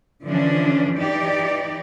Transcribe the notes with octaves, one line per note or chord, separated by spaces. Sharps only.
D3 E3 F3 C#4 D4
E3 D#4 G4 D5